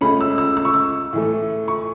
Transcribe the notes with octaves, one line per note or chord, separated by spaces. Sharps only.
C#2 C#3 A3 C#4 B5
E6
E6
E6
C#6
E6
A2 E3 A3
C#6